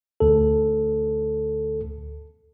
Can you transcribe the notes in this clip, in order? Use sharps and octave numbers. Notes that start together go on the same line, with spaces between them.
D2 A4